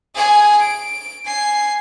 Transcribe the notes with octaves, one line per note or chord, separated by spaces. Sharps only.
G#4 G#5
D7
G#5 C7